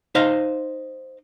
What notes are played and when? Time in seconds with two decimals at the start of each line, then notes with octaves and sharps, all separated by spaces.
0.15 D#4 C5 D#5 F5